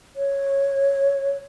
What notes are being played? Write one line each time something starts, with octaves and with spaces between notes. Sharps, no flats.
C#5